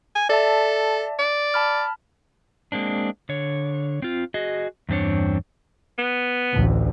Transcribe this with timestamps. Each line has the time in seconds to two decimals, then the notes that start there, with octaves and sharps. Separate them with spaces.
0.15 G#5
0.29 A4 D5 E5 A5
1.19 D5
1.54 A5 B5 F6
2.72 G#3 A#3 C4 D4
3.29 D3 C#5
4.02 C4 F4
4.34 F#4 G#4 D#5
4.89 E2 G2 C4 D4 C#5
5.98 B3
6.53 A1 D2